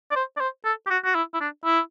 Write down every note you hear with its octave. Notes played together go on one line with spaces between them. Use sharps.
D5
C5
D5
C5
A4
G4
F#4
F#4
E4
E4
D4
E4